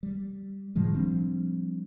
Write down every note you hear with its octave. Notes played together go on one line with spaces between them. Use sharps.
G3
A2 D#3 F3 G#3
F3 G3 C4 D4